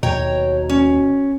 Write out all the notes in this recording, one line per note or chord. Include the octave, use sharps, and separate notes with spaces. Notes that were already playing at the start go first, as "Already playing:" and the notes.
D#2 B2 C#5 G5 A#5
C#4